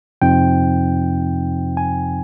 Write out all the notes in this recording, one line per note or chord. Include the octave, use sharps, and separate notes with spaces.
F2 C3 F3 C4 D#4 G5
G#5